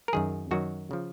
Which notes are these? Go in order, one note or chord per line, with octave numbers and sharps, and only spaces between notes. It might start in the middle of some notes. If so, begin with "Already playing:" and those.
A#4
F#2 D#3 F#3 G#4
F#2 D#3 F#3 F#4
C#3 F3